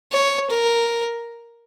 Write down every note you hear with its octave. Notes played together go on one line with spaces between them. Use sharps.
C#5
A#4